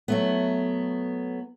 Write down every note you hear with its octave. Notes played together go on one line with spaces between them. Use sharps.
F#3 A3 B3